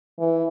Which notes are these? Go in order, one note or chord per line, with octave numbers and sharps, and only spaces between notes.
E3